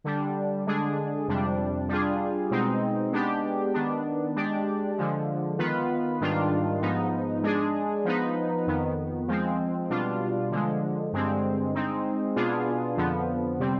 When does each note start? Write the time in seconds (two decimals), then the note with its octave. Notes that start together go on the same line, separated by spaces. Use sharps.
0.04 D3 G3 D4
0.67 D3 G#3 D4 G#4
1.28 F2 C3 G3 D4
1.89 G3 D4 F4 G#4
2.51 B2 G#3 C4 D#4
3.12 G#3 B3 D4 G4
3.74 D#3 B3 D4
4.36 G#3 D4 G4 D5
4.98 D3 F3 G#3
5.58 D#3 B3 F4 B4
6.21 G#2 D#3 G3 D4 F4
6.81 G#2 F3 B3 D#4
7.43 G#3 D4 G#4
8.05 F3 B3 D#4 B4
8.67 F2 D#3 B3
9.28 F3 G#3 C4
9.90 B2 G3 D4 F4
10.51 D3 F3 G#3
11.12 G2 D3 G#3 C4
11.74 G#3 C4 D#4
12.36 B2 B3 D4 F4 G#4
12.97 F2 D3 F3 B3
13.59 C3 G3 C4